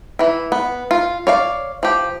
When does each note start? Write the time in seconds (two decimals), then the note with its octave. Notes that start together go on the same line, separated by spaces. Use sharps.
0.19 E3 E4
0.52 B3
0.91 F4
1.27 C#5 D5 F5
1.83 F3 G4